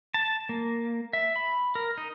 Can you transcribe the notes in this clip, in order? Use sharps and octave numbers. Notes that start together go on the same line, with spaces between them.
A5
A#3
E5
B5
A#4
D#4